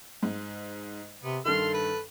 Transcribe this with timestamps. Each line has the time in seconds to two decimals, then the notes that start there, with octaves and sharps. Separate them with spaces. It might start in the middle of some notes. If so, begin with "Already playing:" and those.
0.23 G#2
1.23 C3 B3
1.45 G2 D#3 A4 C6 F6
1.74 B4